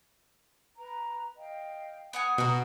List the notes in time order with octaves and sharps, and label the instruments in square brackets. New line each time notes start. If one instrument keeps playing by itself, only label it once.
[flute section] B4 A#5
D#5 F5 G5
[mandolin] B3 F#5 G#5 [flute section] D#6
[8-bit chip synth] B2 [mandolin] F#4 A#5